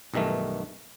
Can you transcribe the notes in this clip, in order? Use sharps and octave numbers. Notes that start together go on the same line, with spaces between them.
B1 G2 D#3 E3 A3